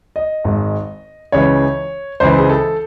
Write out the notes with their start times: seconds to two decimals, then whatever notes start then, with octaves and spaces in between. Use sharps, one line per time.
0.16 D#5
0.44 G#1 G#2 D#3
1.32 C#2 C#3 E3 C#5
2.20 C#2 C#3 E3 C5
2.38 G#4
2.49 A4